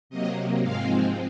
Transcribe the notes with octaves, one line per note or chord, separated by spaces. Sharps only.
C3 F#3 A#3 D#5
G#2 F3 G#3 C4 F5